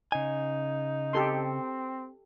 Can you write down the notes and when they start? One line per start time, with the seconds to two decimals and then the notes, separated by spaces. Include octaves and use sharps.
0.12 C#3 D#4 G#5
1.13 C4 G4 A4 C6